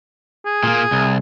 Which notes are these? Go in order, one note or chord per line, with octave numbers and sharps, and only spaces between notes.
G#4
A#2 A#3
C2